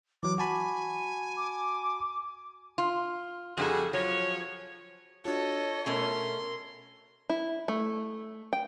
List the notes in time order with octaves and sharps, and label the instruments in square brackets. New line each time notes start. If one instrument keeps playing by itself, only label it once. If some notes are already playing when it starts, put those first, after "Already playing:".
[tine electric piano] E3 F#3 [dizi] D6
[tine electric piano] F#4 A5 B5 [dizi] G#5
[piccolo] D6
[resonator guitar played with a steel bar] F4
[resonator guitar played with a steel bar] F2 D4 A4 [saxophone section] G3 F#4 G#4
[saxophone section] F3 C#5 [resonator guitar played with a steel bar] F#3
[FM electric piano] D4 F4 F#4 [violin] A4 D#5 [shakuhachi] C#5
[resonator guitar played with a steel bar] B2 A3 C#4 [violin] A#4 C6
[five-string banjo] E4
A3
G5